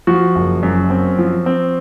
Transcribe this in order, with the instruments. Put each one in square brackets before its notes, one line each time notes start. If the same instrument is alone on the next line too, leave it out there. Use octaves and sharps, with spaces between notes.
[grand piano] F3 F#4
F#1
F#2
C4
F3
C4